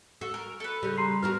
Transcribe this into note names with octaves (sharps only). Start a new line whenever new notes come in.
F#4 A4
A#4
A4 B4
C#3 G3
A#5 C6 C7
B3 F#4 A#4 F6